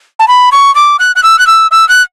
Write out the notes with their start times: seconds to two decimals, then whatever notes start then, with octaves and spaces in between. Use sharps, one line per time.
0.19 A5
0.28 B5
0.52 C#6
0.75 D6
0.99 F#6
1.16 F#6
1.23 E6
1.39 F#6
1.47 E6
1.71 E6
1.89 F#6